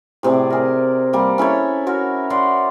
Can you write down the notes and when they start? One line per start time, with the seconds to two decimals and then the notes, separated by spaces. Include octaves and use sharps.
0.23 A2 C3 G#4 D5
0.50 G#4 A#4
1.13 G3 A#3
1.38 C#4 E4 A4 C#5
1.86 F#4 A#4 C#5
2.30 C#5 D5 F#5 C6